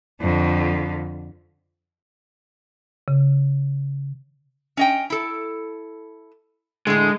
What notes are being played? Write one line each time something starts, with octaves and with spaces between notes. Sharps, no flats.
F2 D3
C#3
C#4 D#5 G5
E4 A4
A2 D3 G#3